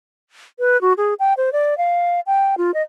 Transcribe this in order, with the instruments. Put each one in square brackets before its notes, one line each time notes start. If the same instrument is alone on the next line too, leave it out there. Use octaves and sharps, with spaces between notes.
[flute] B4
F#4
G#4
G5
C5
D5
F5
G5
F4
D#5